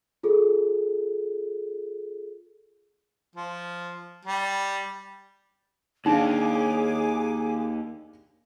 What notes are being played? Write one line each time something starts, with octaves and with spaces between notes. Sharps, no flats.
F4 G#4 A4
F3
G3
D#2 D4 D#4 G#4 F5 G#5 D6